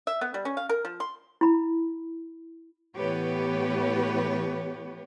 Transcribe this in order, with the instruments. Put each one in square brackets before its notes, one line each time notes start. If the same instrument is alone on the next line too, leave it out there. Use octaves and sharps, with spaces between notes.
[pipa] E5
B3
G3
C#4
F5
A#4
F3
C6
[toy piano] E4 B5
[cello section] A2 E3 B3 G4 B4 C#5